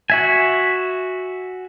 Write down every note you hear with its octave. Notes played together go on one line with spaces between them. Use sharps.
F#4 E5 G#5